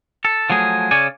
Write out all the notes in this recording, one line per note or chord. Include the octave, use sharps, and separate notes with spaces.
A4
F3 F#3 A3 G#4
C#3 C#5 D5 G#5